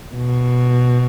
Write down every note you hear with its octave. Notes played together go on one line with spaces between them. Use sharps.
B2